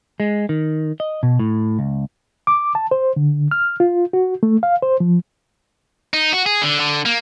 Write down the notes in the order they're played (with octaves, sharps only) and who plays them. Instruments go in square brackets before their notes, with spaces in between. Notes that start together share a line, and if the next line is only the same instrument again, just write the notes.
[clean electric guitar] G#3
D#3
D#5
B2
A2
C#2
[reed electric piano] D6
A5
C5
D3
F6
F4
F#4
A3
F5
C5
F3
[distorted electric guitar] D#4
F#4
G#4
D3
D3
A#3